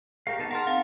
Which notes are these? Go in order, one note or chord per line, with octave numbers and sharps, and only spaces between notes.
G4 G#4 A#4 F5
B3 D#4 A5
A#4 F#5 A5 C6 F6
C4 D#4 F5